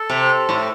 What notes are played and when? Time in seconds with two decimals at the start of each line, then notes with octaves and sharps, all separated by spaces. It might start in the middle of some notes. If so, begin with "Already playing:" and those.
Already playing: A4
0.10 C3
0.49 A2